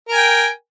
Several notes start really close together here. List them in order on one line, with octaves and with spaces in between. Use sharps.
A#4 G#5 G5